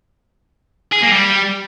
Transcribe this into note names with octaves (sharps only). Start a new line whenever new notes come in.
G#4
A#3
G3